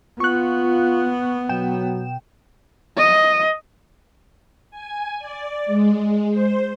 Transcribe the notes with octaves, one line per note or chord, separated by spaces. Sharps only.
B3 F4 C#6 F#6
B2 F#3 G5 E7
D#5
G#5
D5
G#3
C5